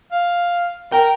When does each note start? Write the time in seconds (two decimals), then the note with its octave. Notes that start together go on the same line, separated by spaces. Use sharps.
0.12 F5
0.92 A#4 G5